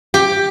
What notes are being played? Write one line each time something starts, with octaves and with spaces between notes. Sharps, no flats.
G4